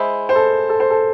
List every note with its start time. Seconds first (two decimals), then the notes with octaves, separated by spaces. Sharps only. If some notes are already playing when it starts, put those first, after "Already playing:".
Already playing: G#3 E4 C5
0.29 C5
0.35 A4
0.69 A4
0.80 C5
0.90 A4